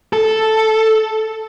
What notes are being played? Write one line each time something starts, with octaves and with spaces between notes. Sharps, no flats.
A4